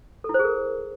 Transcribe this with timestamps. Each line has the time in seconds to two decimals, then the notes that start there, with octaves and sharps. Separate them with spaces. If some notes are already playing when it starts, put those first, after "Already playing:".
0.24 A4
0.29 E4
0.34 C5
0.39 G#4
0.44 A#4